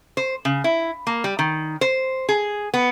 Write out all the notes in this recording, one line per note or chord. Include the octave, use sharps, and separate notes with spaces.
C5
C#3
E4
A#3
G3
D#3
C5
G#4
B3